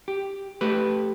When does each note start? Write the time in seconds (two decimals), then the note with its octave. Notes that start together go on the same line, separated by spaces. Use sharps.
0.08 G4
0.61 A3 G4 B4